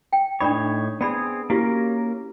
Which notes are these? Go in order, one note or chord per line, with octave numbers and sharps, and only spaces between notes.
G5
A2 D4 D#4 C#5 D5 B5
B3 C4 G#4 D5 B5
A#3 C#4 E4 F#4 G4 A#4